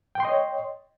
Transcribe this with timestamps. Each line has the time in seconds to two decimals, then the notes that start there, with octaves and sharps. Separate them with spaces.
0.15 G5
0.20 C6
0.25 D#5
0.29 C#5